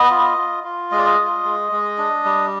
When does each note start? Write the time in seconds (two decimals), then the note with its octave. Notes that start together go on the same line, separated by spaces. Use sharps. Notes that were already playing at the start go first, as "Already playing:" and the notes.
Already playing: B3 D#5
0.11 F4
0.38 F4
0.64 F4
0.91 G#3 D#5
0.99 D5
1.06 D#5
1.19 F4
1.44 G#3
1.72 G#3
1.98 D4
2.25 G3